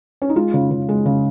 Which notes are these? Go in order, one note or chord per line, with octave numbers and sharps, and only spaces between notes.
C#4
D#4
G#3 F4
C#3
C#3
G#3
C#3